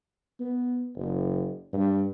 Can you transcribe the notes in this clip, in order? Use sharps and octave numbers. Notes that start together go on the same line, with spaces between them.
B3
F#1
G2